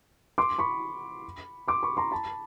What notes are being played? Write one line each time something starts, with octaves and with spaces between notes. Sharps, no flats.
C6 D6
B5 C#6
C6 D6
B5 C#6
A#5 C6
A5 B5